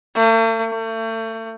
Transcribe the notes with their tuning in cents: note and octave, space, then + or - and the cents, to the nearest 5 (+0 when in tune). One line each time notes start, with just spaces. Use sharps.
A3 +45
A3 +35